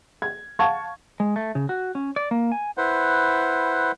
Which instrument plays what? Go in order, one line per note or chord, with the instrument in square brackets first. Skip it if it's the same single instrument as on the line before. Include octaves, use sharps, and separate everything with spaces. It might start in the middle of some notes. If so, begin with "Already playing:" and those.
[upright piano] G#6
F5 F#5 A5 C#6 G#6
[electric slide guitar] G#3
A3
C#3
F#4
C#4
D5
A#3
G#5
[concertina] E4 B4 C5 F#5